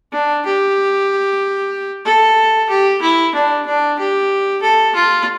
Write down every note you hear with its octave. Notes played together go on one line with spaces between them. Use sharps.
D4
G4
A4
G4
E4
D4
D4
G4
A4
F4